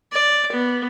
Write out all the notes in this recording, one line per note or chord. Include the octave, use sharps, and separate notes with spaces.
D5
B3